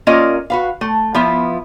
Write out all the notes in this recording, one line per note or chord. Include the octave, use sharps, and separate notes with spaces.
A#3 C#4 F4 A#4 D5 D#5
F#4 B4 F5
A3
F3 B3 E4 F4